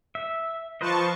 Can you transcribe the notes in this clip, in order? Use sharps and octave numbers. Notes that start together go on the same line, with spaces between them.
E5
F3 B4 C5 D#5 A5 C#6